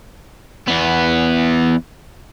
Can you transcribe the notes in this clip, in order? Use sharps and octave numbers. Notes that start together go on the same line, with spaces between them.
E2 B3